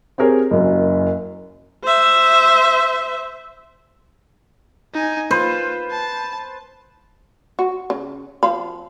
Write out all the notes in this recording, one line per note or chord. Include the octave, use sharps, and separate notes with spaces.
C4 G4 G#4 A#4 C#5
F#1 F#2
C5 E5
D#4 G#5
F4 B4 C5
A5
F#4
C#3
F3 F5 B5